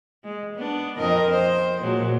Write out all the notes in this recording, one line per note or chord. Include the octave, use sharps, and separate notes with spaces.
G#3
B3 D4
F2 A#4 D#5
C5
A#2 F#3 G#3